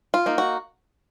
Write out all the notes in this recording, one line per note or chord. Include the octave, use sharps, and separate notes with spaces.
F4
A#3 D#4
F#4